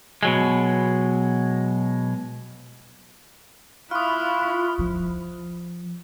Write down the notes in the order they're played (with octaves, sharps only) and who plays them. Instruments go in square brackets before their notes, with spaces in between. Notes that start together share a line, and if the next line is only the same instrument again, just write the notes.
[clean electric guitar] B2 F#3 G#3
[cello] E4 [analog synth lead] F4 [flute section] B5 C#6 F#6 [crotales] D#6 F6
[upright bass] F3